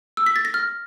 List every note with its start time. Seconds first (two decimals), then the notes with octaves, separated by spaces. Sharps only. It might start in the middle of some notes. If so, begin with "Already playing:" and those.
0.17 E6
0.26 B6
0.36 A6
0.45 A#6
0.54 F6